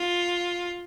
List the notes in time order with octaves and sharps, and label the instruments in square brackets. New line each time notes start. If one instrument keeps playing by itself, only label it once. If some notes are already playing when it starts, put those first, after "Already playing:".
Already playing: [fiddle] F4